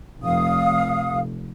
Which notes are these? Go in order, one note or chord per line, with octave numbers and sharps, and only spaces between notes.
F1 F5 D#6